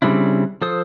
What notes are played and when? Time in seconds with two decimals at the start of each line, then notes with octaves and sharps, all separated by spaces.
0.02 C#3 G3 C4 D4 E4
0.62 F3 A4 C5 D#6